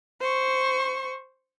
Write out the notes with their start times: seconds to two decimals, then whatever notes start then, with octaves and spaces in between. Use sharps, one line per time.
0.21 C5 C#6